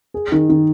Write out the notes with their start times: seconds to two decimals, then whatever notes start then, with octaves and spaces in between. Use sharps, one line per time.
0.14 G#4
0.32 D#3
0.49 D#3